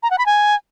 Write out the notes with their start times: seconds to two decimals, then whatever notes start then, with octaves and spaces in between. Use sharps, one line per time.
0.03 A#5
0.10 F#5
0.18 B5
0.26 G#5